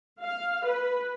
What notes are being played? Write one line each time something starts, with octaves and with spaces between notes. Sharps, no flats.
F5
B4